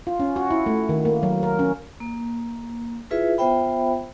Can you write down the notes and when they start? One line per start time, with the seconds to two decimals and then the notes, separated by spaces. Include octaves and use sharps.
0.07 F4
0.20 C#4
0.36 F#4
0.51 E4
0.66 A3
0.89 D#3
1.05 A#3
1.23 F#3
1.43 A#4
1.59 C#4
2.00 A#3
3.11 E4 F4 G#4 B4 E5
3.38 B3 F4 C5 E5 G5 B5